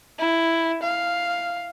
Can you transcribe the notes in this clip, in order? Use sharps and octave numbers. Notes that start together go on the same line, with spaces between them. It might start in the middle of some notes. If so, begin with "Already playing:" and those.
E4
F5